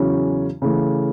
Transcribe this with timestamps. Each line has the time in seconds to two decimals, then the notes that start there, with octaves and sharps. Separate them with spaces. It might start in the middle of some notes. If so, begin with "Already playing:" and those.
Already playing: E2 C#3 F#3 C#4 E4
0.62 C#3 E3 A3